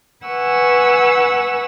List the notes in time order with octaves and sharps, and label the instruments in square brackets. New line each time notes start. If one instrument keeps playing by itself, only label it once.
[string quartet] B4 F#5 G#5 C#6 E6